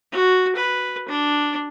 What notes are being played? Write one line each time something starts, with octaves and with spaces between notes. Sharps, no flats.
F#4
B4
D4